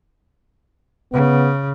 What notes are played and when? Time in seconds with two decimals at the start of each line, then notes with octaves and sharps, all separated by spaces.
1.13 C#3 B3